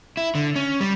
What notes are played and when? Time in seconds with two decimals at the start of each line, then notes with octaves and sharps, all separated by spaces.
0.17 E4
0.35 D3
0.56 C#4
0.81 G3